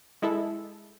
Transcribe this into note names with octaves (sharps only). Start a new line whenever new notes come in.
G#3 E4 A4